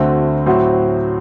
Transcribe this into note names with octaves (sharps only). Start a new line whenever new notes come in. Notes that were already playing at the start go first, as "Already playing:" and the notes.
Already playing: D2 D3 A3 C4 F#4
A2 F#3 C4 F#4 C5